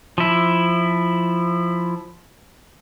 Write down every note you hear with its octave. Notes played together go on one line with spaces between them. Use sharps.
F3 E4